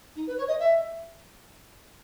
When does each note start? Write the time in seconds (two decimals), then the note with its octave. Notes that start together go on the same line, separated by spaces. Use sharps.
0.15 D#4
0.26 B4
0.37 C#5
0.48 D#5
0.59 E5